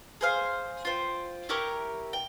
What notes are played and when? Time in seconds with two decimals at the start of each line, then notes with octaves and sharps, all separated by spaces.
0.21 G#4 C5 F5
0.85 F4 C5 G5
1.49 E4 G4 A#4 C#5
2.13 G5